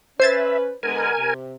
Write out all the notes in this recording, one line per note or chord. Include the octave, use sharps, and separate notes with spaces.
C#4 B4 C5 E5 G#6 A6
D3 G#3 B3 A#4 G#5
C3